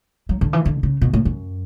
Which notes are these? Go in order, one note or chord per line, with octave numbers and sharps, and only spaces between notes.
F#3
D3
E3
D3
C#3
B2
A2
F#2